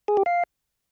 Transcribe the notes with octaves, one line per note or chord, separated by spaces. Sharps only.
G#4
G4
F5